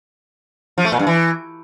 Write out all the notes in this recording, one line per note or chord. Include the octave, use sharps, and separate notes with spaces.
F3
A3
A#2
G2
E3